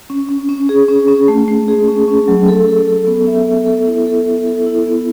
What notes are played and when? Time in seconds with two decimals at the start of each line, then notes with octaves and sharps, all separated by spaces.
0.10 C#4
0.29 C#4
0.49 C#4
0.69 G#4
0.89 C#4
1.08 C#4
1.28 A3
1.48 A3
1.68 G#4
1.88 C#4
2.08 C#4
2.28 F#3
2.48 A4
2.68 A4
2.88 A4
3.07 B3
3.27 E5
3.46 B3
3.66 A4
3.87 E4
4.07 A4
4.27 A4
4.46 A4
4.67 E4
4.87 B3